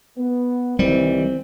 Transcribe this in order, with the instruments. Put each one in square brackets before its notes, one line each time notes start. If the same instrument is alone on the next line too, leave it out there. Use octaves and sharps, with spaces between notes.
[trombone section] B3
[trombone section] C2 D#3 E3 [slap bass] G3 [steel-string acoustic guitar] C4